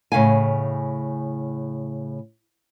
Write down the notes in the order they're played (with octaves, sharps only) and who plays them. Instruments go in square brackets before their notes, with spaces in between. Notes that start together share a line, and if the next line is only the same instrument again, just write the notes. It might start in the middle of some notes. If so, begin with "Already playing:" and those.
[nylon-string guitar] A2 C#3 F5 G#5